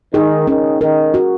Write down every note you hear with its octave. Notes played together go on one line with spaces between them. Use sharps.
D#3 G#4
D#3 C#4
D#3 A#4
F#4